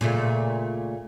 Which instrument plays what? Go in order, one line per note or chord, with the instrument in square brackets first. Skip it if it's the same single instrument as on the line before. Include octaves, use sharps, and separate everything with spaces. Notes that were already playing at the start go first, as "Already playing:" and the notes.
[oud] A#2 C#3 A3